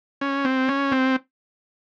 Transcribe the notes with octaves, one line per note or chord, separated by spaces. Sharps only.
C#4
C4
C#4
C4